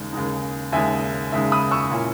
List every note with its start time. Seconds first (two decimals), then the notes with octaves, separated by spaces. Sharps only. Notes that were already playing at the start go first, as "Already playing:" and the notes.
Already playing: D#2 C#3 G#3 D#4
0.13 D#2 C#3 G#3 D#4
0.72 D#2 C#3 G#3 D#4 E5 G#5
1.32 D#2 C#3 G#3 D#4 E5
1.52 B5 D#6
1.71 C#6 E6
1.91 A#2 A#3 C#4 E4